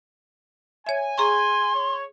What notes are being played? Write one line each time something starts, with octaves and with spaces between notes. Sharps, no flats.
C#5 E5 G#5
G#4 A#5 C6 C#6
C#5